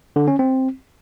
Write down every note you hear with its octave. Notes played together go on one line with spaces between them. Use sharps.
D3
C#4
C4